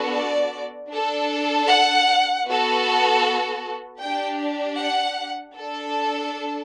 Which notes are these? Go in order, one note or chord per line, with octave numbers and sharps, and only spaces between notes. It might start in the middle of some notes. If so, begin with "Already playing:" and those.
Already playing: B3 D4 F#4 A4
D5
D4 A4
F#5
B3 F#4 A4
D4 G4 G5
F#5
D4 A4